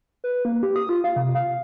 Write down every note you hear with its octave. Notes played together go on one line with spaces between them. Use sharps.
B4
A#3
G4
D#6
F4
F5
C3
F5